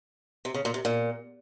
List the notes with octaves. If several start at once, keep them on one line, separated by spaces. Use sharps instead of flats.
C3
C#3
A#2
C3
A#2